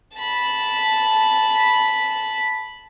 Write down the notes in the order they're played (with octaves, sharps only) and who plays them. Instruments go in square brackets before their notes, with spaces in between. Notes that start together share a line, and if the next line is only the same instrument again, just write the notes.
[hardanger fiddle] A5 B5